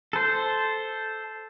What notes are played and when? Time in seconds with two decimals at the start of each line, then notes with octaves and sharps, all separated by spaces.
0.13 A4 C5